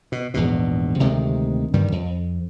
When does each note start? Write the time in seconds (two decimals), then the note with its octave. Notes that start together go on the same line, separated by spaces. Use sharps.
0.12 B2
0.34 A#1 E2 G#2 B2
1.00 D2 C3 D#3 G#3
1.73 G2 D3 D#3 G3
1.92 F2